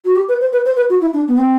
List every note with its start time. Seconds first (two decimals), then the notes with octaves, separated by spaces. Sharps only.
0.05 F#4
0.16 G4
0.28 B4
0.40 C5
0.52 B4
0.65 C5
0.76 B4
0.90 F#4
1.01 E4
1.13 D4
1.28 B3
1.38 C4